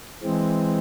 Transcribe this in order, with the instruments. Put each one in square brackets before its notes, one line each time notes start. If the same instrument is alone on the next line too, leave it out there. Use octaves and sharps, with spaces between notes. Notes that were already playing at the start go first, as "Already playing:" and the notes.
[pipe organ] E3 G#3 C4